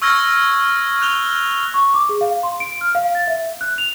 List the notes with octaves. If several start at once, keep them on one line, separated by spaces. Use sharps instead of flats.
C#6 E6 F6 G#6 A#6
F#6 F7 G7
C#6
D6
G#4
F5
C6
D7
F6
F5
A6
E5
F#6
F7